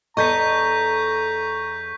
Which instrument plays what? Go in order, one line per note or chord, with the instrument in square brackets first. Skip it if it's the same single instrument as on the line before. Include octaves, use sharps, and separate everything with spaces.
[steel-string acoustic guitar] E2 A4 D#5 [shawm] A#5 [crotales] C#6 G6 B6